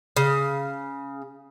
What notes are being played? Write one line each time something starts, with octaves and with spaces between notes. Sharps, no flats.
C#3